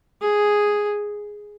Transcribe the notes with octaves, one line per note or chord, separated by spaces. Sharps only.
G#4